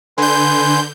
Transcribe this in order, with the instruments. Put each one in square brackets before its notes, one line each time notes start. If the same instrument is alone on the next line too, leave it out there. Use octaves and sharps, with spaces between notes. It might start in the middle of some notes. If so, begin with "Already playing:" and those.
[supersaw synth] D3 G6 [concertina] B4 G#5 C6